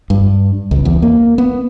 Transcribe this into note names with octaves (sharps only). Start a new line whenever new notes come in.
G2
C#2
E2
A#3
B3